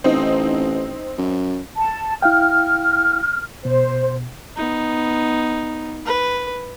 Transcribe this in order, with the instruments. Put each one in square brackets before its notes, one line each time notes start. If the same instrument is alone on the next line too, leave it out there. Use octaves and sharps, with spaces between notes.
[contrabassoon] A1 [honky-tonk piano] C4 D#4
[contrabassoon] F#2
[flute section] A5
[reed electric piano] E4 F5 G5 [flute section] F6
[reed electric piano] B2 [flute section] C5
[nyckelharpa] B3 D#4
B4